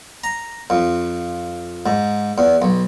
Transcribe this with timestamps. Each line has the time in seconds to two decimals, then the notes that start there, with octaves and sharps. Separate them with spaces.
0.24 A#5
0.70 F2
1.86 G#2
2.38 E2
2.62 B1